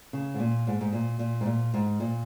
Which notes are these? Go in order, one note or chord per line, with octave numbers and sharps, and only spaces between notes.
C#3
G#2
A#2
G#2
G#2
A#2
A#2
G#2
A#2
G#2
A#2